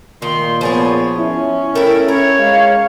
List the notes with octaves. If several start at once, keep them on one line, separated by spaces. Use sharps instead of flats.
A#2 D#3 C6
F3 B3 G#4 C#5
C#4 E4
A3 E4 A#4 G5
C#4 E4 A#4 C#5
G#3 F5